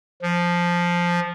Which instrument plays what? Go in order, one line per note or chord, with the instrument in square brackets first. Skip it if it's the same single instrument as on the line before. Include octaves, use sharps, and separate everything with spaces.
[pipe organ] F3